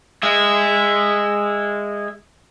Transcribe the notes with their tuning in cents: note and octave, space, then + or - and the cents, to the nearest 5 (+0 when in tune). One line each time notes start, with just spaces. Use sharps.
G#3 -20 E5 +0